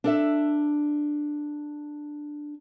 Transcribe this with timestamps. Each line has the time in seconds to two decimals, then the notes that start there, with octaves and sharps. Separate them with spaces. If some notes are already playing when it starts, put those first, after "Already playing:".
0.04 D4 A4 E5